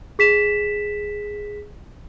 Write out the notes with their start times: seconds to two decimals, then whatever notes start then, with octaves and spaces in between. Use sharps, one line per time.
0.19 G#4 B6 E7